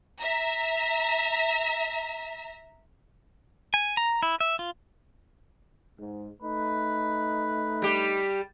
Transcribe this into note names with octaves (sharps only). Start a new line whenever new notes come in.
E5 A#5
G#5
A#5
E4
E5
F4
G#2
A3 D#4 B4
G3 G4